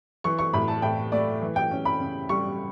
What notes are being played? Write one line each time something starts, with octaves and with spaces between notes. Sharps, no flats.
E3 C#6
C#6
A2 B5
A5
A2 G5
A3 D5
E3
G5
C#4
B5
C#3
G3 C#6